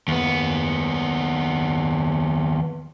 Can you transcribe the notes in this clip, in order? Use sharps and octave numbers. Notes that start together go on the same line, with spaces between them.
D#2 B3